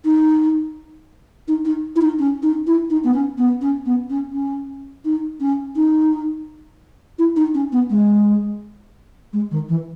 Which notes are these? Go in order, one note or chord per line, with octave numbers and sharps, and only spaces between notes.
D#4
D#4
D#4
E4
D#4
C#4
D#4
E4
D#4
B3
C#4
B3
C#4
B3
C#4
C#4
D#4
C#4
D#4
E4
D#4
C#4
B3
G#3
G#3
D#3
E3